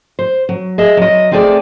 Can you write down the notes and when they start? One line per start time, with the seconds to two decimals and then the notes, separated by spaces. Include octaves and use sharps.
0.19 C5
0.49 F#3
0.78 G#4 D#5 E5
0.97 F#3 D#5
1.31 A3 C4 E4 G#4 A4 D5